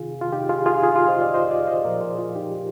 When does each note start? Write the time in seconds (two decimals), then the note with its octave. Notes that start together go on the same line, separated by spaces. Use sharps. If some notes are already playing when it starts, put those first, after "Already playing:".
Already playing: C3 D#3 F4 G#4
0.21 F4
0.33 D#4 G4
0.49 F4 G#4
0.66 F4 G#4
0.83 F4 G#4
0.96 F4
1.08 C5 D#5
1.21 D5 F5
1.34 C5 D#5
1.51 D5 F5
1.67 C5 D#5
1.84 A#2 F3 A#4 D5
2.01 G#4 C5
2.19 F4
2.35 D#4 G4